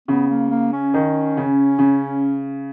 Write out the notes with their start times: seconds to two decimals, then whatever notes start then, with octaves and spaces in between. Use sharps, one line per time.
0.08 C#3 B3
0.30 A#3
0.51 A#3
0.72 C#4
0.94 D#3
1.37 C#3
1.79 C#3